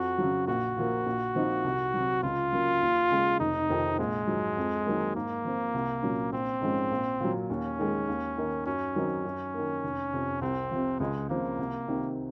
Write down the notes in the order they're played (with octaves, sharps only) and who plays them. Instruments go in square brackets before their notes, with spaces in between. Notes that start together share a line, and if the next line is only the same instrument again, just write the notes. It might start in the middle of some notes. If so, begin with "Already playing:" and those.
Already playing: [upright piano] F2 [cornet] F#4
[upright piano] C#3 F#3
[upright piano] A#1 [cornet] F#4
[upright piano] A#2 F3 A#3
A#1
A#2 F3 C4 D#4
C2
C3 F#3
[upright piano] C#2 [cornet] F4
[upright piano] C#3 F#3 A#3
D#2
C#3 G#3
[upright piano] F1 [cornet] D#4
[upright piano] F2 C3 D#3
[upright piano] A#1 [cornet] G#3
[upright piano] G#2 F#3
F2
D#3 F#3 A#3
[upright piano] G#2 [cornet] A#3
[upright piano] F3 C4
C2
A#2 F#3 C#4
[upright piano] A#1 [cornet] C4
[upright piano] G#2 F3 G#3 C#4
A#1
A#2 F#3
[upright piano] D#2 [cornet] C#4
[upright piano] D#3 G#3
D#2
D#3 A#3 D#4
[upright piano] F#2 [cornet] C#4
[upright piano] D#3 F#3 C4 D#4
F#2
D#3 A#3
F1
F2 C3
[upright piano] C2 [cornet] C4
[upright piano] C3 F3
[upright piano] C#2 [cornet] G#3
[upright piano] C#3 F3 C4 [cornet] A#3
[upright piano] C2
C3 D#3